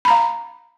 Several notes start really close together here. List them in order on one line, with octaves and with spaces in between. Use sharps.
B5 A#5 F5